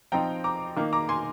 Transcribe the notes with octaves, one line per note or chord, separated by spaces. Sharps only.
F3 C4 D#4 G5 A#5
A#5 D6
D#3 A#3 D#4
A#5 D6
G#5 C6